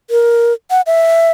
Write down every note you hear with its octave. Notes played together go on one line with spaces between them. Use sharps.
A#4
F#5
E5